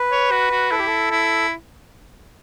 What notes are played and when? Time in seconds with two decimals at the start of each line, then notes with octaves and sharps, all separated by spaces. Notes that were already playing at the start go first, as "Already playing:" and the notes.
Already playing: B4
0.11 C#5
0.31 F#4
0.51 F#4
0.71 E4 A4
0.79 G4
0.87 A4
1.11 E4